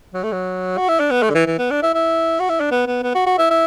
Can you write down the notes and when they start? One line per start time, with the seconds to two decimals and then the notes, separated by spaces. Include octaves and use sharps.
0.14 F#3
0.23 A3
0.32 F#3
0.77 F#4
0.89 E4
1.00 D4
1.11 B3
1.23 A3
1.30 D3
1.35 E3
1.46 E3
1.58 B3
1.71 D4
1.83 E4
1.94 E4
2.40 F#4
2.50 E4
2.60 D4
2.71 B3
2.87 B3
3.03 B3
3.15 F#4
3.27 F#4
3.38 E4
3.51 E4